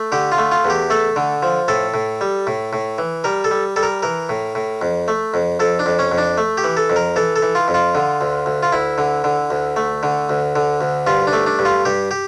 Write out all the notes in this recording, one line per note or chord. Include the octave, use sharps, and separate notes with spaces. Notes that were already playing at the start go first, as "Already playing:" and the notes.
Already playing: A3
D3 G4
F4
A3
F4
E2
G4
A3 A4
D3
F3
A2 A4
A2
G3
A2
A2
E3
G3 A#4
A4
G3
G3 A4
A#4
E3 A#4
A2
A2
F2
A3
F2
F2 A4
D4
F2
C#4
F2
D4
A3
G4
E3
A4
F2
A#4
E3 A4
A4
E3
F4
F2
F4
D3
D2
D2
F4
D2 E4
D3
D3
D2
A3
D3
D2
D3
D2
G2 F4
D4
A3
D4
G2
F4
G2 G4
G4